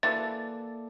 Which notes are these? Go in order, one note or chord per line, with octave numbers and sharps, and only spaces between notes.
E3 A#3 F#4 A4 D5 E5 A6